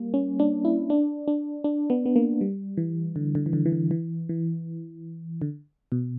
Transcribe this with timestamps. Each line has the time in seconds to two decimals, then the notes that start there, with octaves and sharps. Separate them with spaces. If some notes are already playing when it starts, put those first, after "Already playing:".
Already playing: G3 A#3
0.14 C#4
0.40 D4
0.65 E4
0.90 D4
1.28 D4
1.64 D4
1.90 B3
2.06 B3
2.16 A#3
2.41 G3
2.77 E3
3.16 D3
3.35 D3
3.46 E3
3.53 D3
3.66 E3
3.72 D3
3.91 E3
4.29 E3
5.42 D3
5.92 B2